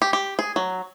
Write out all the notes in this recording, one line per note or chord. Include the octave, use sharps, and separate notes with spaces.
G4
G4
G#4
F#3